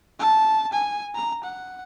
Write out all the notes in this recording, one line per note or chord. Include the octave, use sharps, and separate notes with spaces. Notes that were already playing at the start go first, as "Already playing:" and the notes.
A5
G#5
A#5
F#5